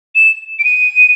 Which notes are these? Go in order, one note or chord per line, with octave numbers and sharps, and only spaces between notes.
E7
D7
D#7